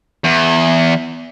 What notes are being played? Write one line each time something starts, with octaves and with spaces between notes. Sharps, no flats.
E2